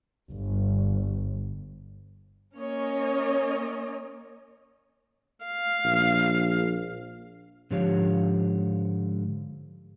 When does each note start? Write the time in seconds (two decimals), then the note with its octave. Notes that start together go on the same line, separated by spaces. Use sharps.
0.30 G1
2.56 A#3 C#4 C#5 D#5
5.45 F5
5.84 A#1
7.70 G#2 D3 F3 G4 C#5 F5